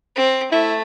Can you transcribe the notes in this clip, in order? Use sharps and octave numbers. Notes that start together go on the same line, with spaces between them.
C4
A3 E4